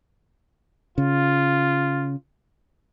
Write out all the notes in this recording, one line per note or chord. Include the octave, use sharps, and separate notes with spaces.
C#3 F4